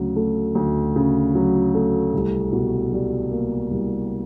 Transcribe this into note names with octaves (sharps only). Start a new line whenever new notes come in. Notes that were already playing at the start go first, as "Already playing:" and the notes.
Already playing: D2 C#3 F#3
A3
D2
C#3
F#3
A3
C2
B2
G3
A#3
C2